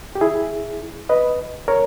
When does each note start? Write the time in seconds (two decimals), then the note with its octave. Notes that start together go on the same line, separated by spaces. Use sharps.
0.15 G4
0.21 E4 G#4
1.09 B4 D#5
1.68 A#4 C#5